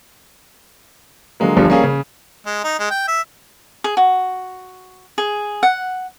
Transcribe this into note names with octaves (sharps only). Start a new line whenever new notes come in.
D3 F#3 G#3 A#3
G1 G2 D3 F3 G3
G3 A#3 C#4 G#4
C#3
G#3
D#4
G#3
G5
E5
G#4
F#4
G#4
F#5